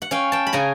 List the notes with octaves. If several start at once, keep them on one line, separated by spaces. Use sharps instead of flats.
F#5
C#4 F5 G5
G5 A5
B5
C#3 G#5 A#5